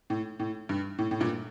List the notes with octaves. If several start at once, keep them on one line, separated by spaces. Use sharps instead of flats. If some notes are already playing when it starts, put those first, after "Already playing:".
A2
A2
G2
A2
A2
G2 A#2